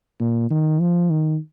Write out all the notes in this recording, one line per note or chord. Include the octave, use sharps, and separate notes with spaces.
A#2
D#3
F3
D#3